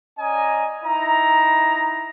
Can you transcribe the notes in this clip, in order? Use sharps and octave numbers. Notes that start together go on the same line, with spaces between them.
C#4 D5 D#5 G#5 A#5
D#4 E4 A#5